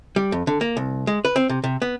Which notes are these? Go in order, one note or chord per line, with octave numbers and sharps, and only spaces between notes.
G3
F2
D3
A#3
C2
G#3
B4
C4
C3
C3
B3